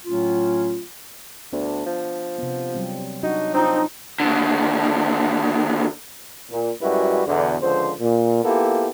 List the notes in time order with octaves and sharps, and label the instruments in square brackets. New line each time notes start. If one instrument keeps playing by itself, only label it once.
[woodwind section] A2 F#3 A3 C#4 F4
[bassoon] D2 [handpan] B3 D4
[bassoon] F3
[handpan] C3 B3
F#3 G3 C4
[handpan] F#3 D4 F#4 [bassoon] D#4
[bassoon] C4 [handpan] D4 F4 [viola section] D#4
[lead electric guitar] D#2 D3
[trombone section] A#2
F#2 G3 G#3 E4 F#4 B4
E2 B2 D3
C#2 D3 F3 C5
A#2
A#3 B3 E4 F4 G4 A4